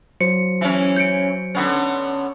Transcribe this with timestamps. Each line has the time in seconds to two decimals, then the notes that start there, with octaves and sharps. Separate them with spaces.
0.21 F#3 C5 C#7
0.61 E3 C#4
0.96 G6 C#7 D7
1.55 D3 B3 C#4